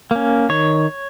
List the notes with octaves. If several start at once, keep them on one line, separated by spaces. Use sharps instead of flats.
A#3 C#4
D#3 C#5